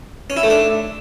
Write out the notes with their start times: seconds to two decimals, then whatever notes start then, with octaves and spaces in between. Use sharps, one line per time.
0.30 C#4
0.37 E4
0.43 A3
0.50 D4